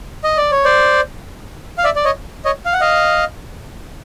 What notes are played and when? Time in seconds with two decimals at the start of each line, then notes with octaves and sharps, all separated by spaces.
0.24 D#5
0.37 D5
0.51 C#5
0.65 C5 D5
1.78 F5
1.84 D5 E5
1.96 D5
2.05 C#5 D#5
2.45 C#5 D#5
2.66 F5
2.73 F#5
2.81 D#5 F5